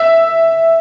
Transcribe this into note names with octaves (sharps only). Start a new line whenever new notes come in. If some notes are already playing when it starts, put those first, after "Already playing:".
Already playing: E5